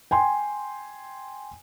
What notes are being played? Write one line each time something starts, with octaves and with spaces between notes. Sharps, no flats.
G5 G#5 C6